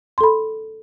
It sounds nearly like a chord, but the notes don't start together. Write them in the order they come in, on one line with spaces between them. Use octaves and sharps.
C6 A4 B5